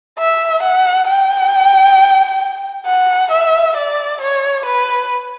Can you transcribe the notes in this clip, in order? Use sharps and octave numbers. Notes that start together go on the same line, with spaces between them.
E5
F#5
G5
F#5
E5
D5
C#5
B4